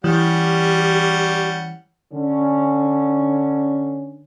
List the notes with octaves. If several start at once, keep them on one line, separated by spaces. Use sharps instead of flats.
E3 G3 C#4 G4 F#5
D3 C#4